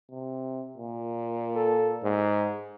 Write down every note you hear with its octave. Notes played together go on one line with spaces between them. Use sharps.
C3
A#2
A4
G#2